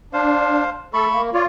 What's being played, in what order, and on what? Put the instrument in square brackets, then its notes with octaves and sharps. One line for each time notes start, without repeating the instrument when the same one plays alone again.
[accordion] D4 [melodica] C5 F5
[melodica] A3 B5 C#6 [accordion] A4
[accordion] A#3
[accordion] F4 [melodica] C#5 D5